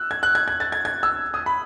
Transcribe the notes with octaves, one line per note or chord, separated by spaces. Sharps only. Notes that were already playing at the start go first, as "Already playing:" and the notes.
Already playing: E6 F#6
G#6
F#6
G#6
G#6
A6
G#6
G#6
E6
D#6
B5